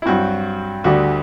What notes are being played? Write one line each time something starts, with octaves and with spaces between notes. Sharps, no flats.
E4
G2 F#3 C4 F#4
D2 D3 G3 D4 F#4